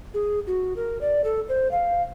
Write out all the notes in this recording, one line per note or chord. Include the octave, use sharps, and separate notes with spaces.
G#4
F#4
A#4
D5
A4
C5
F5